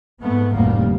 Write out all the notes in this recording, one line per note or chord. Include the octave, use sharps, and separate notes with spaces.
G#2 A3 B3
F1 D2 A2 G3 A#3